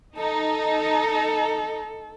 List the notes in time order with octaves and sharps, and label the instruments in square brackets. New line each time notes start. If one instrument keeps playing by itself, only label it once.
[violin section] D#4 [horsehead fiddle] A4